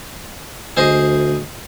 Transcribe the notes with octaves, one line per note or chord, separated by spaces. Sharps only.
D2 G#4 C5 D#5